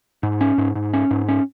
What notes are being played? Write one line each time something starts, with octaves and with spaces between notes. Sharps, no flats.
G#2
C#4
G#2
G#2
C#4
G#2
C#4